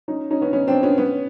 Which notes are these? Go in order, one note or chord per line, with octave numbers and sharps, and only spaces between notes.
C#4 D#4
C#4 D#4
B3 C#4
B3 C#4
C4 D4
B3 C#4
B3 C#4